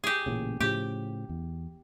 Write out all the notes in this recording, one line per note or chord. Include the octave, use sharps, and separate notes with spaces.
G4 G#4
A1 A#2 C#3
A2 C#3 F3 G4
E2